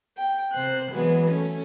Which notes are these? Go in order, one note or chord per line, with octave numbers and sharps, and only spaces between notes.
G5
C3 C5 F#6
E3 F#3 G#3 B3
A3 C#4